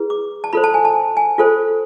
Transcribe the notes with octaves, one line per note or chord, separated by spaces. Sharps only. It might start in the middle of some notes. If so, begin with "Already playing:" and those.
Already playing: E4 G#4 B4
D6
A5
F4 A4 C5 B5
A5
G#5
A5
G#5
F4 A4 C5